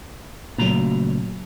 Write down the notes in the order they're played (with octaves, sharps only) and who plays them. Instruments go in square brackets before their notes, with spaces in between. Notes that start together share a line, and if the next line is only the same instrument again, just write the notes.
[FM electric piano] A#2 F#3 [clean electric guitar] C#3 A3 A#5